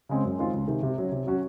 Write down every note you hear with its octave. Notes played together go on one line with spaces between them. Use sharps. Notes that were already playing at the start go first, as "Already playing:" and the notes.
C#3 G#3 C4
F#2
D#3 G#3 C4 F4
C#2
C3 D#3
C3
F#3 C#4
C3
F#3 C#4 F#4